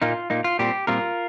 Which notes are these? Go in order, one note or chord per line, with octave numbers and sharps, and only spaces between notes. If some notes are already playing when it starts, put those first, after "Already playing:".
A#2 A#3 D#4 F4
A#2 A#3 D#4
F4
A#2 G3 C4 G4
A#2 G3 C4 F4 A#4